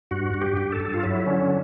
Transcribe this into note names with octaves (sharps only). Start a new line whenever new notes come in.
G2 F#4
G2
G4
G2
A4
G2
F4
F#3 E4
D3 C#4